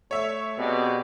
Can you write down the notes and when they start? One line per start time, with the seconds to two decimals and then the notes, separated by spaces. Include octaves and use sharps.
0.11 A3 C#5 E5
0.58 B2 C4 G4 G#4 D5